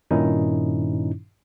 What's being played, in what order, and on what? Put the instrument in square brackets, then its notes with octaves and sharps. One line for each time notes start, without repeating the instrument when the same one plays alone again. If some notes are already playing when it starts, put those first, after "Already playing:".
[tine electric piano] G2 A#2 D#3 C#4 D#4 E4